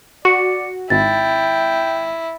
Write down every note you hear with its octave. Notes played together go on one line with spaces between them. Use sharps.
F#4 D5 C#7
G#1 E4 G5 A6